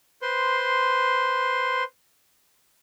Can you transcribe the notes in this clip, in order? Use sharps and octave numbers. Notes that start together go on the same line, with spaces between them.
B4 C5 C6